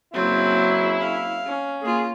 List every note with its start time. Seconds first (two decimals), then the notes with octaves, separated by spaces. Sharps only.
0.14 F#1 C#3 F#3 A#3 C4 E4
1.00 F5
1.47 C#4
1.82 A#3 F4 G#4